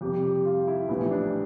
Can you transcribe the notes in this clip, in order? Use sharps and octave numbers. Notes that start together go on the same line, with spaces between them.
F2 C3 G3 G4
G4
F4
E4
A#1 A2 E3 G3 E4
D4